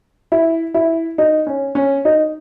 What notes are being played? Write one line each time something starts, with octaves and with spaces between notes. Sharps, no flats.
E4
E4
D#4
C#4
C#4
D#4